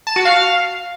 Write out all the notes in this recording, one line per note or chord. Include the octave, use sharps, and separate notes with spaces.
A5
F#4
F5